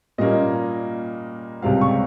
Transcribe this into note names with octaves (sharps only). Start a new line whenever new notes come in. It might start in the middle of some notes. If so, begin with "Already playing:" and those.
A#2 G3 A#3 C#4 D#5
C#2 C3 G3 C4 F5
C#6